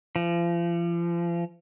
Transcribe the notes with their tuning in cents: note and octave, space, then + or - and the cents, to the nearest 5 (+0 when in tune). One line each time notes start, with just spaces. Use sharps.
F3 -35